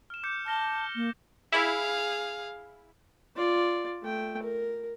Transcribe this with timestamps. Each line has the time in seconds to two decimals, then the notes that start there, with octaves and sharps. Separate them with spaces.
0.10 F6 E7
0.23 D6 G6 C#7
0.46 A5 F6 A#6 G7
0.95 A#3
1.52 E4 G#4 F5
3.36 F4 D5
4.02 A3 G5
4.42 A#4